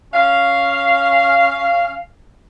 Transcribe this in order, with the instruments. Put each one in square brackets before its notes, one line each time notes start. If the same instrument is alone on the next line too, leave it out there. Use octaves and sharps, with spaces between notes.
[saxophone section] C#4 F5